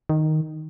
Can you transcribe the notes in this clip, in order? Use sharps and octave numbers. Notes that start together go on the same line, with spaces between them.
D#3